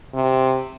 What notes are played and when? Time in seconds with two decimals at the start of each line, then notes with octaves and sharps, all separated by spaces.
0.14 C3